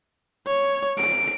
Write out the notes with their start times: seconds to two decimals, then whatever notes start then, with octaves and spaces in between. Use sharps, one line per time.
0.47 C#5
0.98 D7